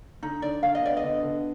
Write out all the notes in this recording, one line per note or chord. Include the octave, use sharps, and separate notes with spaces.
D3 D#4
D3 D5
D3 F5
D#5
B3 D5
D#5
D3
D3